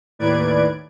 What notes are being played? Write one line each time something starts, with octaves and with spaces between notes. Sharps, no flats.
D#2 A2 B4 D5 G#6 D7